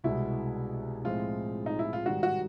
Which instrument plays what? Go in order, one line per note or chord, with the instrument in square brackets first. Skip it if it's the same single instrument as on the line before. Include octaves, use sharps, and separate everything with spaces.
[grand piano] C2 B2 G#3 [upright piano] E4
[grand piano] A2 F3 G#3 C4 [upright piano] F4
[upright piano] D#4
E4
F4
[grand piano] G#2 D#3 G3 [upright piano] F#4
[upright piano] F#4